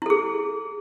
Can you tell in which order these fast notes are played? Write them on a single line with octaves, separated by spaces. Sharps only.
E4 A4 G#4